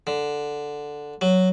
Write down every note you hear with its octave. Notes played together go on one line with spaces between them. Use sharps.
D3
F#3